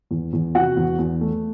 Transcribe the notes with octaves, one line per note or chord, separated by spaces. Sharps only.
E2
E2
C3 F#4 F#5
E2
E2
A3